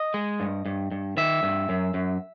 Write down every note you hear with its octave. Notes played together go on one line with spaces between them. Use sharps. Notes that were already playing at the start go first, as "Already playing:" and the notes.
Already playing: D#5
G#3
G2
G2
G2
D#3 E5
G2
F#2
F#2